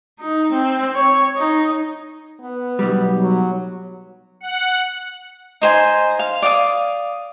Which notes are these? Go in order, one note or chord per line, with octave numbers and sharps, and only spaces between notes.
D#4
C4
C#5
D#4
B3
B1 G3
F#3
F#5
D#4 C5 G#5 C6
F5
D5 F5 D#6